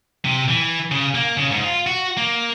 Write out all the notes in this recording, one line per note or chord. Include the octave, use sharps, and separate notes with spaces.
C3
E3
C#3
A#3
C#3
G#2
F4
F#4
A#3